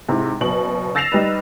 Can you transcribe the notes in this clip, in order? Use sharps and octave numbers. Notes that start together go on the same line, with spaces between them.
G#2 C3 E4
F#1 B2 F#7
E6 A6 A#6 C7 E7 F7
G3 D#4 B4